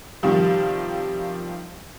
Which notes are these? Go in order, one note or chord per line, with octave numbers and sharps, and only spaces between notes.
C3 D#3 F3 G3